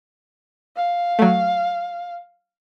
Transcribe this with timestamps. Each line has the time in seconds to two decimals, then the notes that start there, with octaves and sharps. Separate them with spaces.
0.76 F5
1.19 F#3 A3